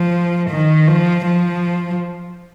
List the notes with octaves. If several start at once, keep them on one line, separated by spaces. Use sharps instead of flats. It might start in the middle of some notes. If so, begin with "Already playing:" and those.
Already playing: F3
D#3
F3
F3